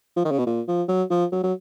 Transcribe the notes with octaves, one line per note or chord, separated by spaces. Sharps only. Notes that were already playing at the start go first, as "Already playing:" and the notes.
F3
D#3
C#3
B2
A#2
F3
F#3
F3
F#3
F#3